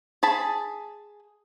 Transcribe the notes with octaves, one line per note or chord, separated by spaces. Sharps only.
G#4 A5 B5